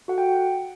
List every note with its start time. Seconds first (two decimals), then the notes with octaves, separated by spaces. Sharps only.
0.08 F#4 A4 F#5
0.18 G5